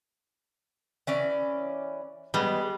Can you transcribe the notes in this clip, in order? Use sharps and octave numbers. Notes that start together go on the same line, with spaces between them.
E3 C#4 D5
G3 G#3 B3